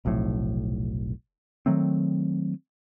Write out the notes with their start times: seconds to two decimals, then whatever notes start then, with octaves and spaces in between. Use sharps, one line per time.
0.05 F1 B1 F2 A2
1.66 D#3 F#3 A3 C4